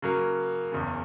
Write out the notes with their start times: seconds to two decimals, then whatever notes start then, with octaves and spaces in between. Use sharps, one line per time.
0.02 C#3 F#3 A#3
0.72 F#1 E2 C#3